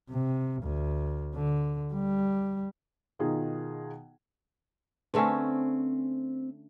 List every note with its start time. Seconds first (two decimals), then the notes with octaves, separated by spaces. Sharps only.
0.10 C3
0.63 D2
1.35 D3
1.93 G3
3.19 B2 D#3 D#4 F4 G#4
5.14 D3 A3 C4 C#4 G#4 B4